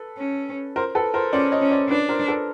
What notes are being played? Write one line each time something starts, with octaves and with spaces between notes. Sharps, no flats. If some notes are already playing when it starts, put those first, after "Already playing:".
Already playing: A4 B4
C#4
A#4 C5
A4 B4
A#4 C5
C#4 C5 D5
C#5 D#5
C#4
C5 D5
D4 B4 C#5
A#4 C5
A4 B4